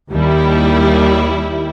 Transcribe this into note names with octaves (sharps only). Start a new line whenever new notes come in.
D#2 G3 E4